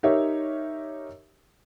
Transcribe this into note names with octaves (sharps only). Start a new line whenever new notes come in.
D#4 G4 A#4 C#5 E5